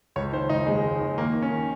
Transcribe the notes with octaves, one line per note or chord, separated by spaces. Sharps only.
C#2 C#5
D#3 C5
C#2 D#4
D#2 G#3
D#2
D#2
D#3 A#3
D#3
C#4
D#3